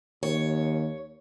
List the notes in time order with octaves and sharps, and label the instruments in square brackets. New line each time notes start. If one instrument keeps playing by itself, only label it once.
[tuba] D#2 [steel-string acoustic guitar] C#5